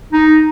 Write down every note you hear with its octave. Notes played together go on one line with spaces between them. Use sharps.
D#4